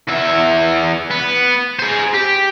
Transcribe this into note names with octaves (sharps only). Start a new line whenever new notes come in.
E2 E5
B3
G#4 C5
G4